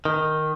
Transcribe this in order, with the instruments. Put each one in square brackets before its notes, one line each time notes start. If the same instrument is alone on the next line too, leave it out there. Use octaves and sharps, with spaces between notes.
[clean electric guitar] D#3